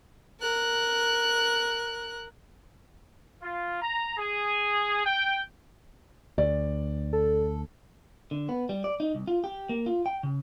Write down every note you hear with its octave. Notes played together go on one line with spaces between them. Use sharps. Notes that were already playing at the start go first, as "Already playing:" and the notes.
A#4 F#6
F4
A#5
G#4
G5
D2 D5
A4
D3
B3
G3
D5
D#4
C2
F4
G4
A#3
F4
G5
C#3